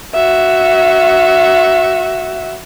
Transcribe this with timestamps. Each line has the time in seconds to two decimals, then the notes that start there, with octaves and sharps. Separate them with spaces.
0.15 F#4 E5